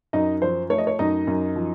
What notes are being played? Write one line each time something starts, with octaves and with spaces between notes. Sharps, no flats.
F#2 D#4 D#5
F3 C5
A3 C#5
D#5
C#5
F#2 D#4 D#5
F#2
F3